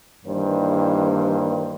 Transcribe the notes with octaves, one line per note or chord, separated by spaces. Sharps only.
G2 D#3 E3 A#3 C5